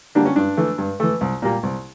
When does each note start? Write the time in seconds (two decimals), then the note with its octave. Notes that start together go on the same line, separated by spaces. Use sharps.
0.15 D3 G3 A#3 D4
0.26 C#4
0.36 G2 D4
0.57 E3 A3
0.78 G2
1.00 E3 A3
1.21 C2
1.42 A#2 G3 A#3
1.63 C2